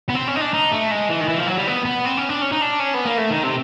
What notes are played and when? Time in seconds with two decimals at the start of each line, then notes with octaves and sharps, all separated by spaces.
0.09 B3
0.15 C4
0.27 C#4
0.36 D#4
0.41 D4
0.54 D#4
0.72 A3
0.91 G#3
1.10 E3
1.21 D#3
1.29 E3
1.38 F3
1.47 F#3
1.58 G3
1.67 B3
1.85 B3
2.05 C4
2.17 C#4
2.29 D4
2.42 C#4
2.52 D#4
2.62 D4
2.80 C#4
2.94 B3
3.05 A#3
3.18 A3
3.30 D#3
3.43 C3